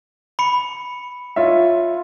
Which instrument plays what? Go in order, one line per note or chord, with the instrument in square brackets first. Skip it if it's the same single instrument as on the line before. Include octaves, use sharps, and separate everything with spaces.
[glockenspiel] B5 C#7
[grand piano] F4 C#5 E5